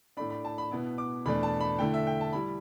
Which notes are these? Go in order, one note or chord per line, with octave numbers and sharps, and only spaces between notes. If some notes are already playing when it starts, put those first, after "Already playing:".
A2 A3 D4 B5
B5
A5
B5
B2 B3 E4
D6
E2 B2 A3 D4 B5
A5
B5
D3 A3 E4 G5
E5
G5
A5
G3 E4 B5